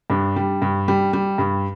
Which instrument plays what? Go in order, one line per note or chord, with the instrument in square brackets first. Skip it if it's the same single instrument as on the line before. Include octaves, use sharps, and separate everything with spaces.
[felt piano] G2 D4
G3
G2
G3
G3
G2